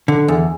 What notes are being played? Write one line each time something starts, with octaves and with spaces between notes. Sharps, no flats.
D3
E2